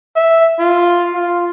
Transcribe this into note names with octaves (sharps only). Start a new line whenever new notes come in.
E5
F4
F4